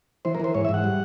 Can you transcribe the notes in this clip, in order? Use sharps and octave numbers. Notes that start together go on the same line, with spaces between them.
E3 C5
A#4
E3 C5
G#2 C#5
E5
G#2
F#5
G3